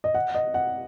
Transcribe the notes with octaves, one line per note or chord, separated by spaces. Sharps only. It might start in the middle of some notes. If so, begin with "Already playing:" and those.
D#5
F#5
D#5
F#5